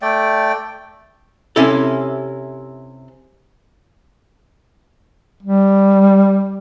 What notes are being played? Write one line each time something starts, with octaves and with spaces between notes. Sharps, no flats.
A3 D5 G5
C3 C#4 E4 A4
G3